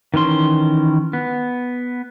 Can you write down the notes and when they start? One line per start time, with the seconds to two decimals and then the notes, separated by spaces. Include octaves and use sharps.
0.14 D#3 E3 C#4 C6
1.13 B3